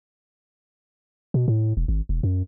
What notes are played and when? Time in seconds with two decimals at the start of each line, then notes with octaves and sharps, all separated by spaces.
1.34 B2
1.48 A2
1.77 E1
1.88 G#1
2.09 E1
2.23 F#2